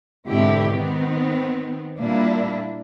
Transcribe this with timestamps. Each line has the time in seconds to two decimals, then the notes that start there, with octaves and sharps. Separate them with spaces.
0.28 G#2 B2 D3 C4 E4 G4
0.70 D#3 B3 C4
2.00 A#2 G3 A#3 D4 E4